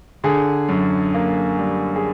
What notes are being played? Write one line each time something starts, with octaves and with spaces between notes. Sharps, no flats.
D3 G#4
F#2
A#3
G3
G#4